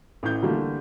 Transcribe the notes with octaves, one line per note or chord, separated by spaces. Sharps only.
A1 A2 G6
D3 E3 G3 A3 A#3